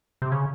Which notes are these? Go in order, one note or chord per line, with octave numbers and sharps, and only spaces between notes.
C3
C#3